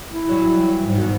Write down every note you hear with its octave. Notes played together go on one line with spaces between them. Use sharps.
E4
E3 F#3 G3
G#2
B2 D#3